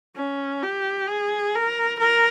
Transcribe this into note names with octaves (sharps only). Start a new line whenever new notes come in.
C#4
G4
G#4
A#4
A#4